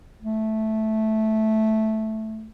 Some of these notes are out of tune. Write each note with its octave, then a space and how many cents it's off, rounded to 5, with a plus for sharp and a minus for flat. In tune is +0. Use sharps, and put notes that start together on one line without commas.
A3 -5